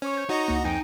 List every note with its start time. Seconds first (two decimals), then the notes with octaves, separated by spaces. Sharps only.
0.02 C#4 C5 C#5 C#6
0.17 G6
0.29 D#4 F#4 D#5 A#5
0.47 C#2 A#3 F#5
0.65 F2 D#4 G5 G#5